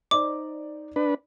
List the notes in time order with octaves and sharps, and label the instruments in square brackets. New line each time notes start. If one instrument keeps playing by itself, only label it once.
[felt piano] D#4 C5 D5 [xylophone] D6
[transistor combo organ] D4 B4